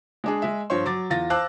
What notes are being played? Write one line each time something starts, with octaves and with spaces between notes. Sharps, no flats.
G#3 D4 G#4
G#3 E5
G2 F3 C5 C#5 C6
F#3 D6 A6
E2 F4 A6 A#6
C5 F5 A5 D6 E6 F#6